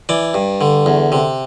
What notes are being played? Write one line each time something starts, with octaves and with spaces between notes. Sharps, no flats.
E3 D5
G2
D3
E2
C3